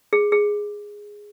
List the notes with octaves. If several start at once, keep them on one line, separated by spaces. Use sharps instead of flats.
G#4
G#4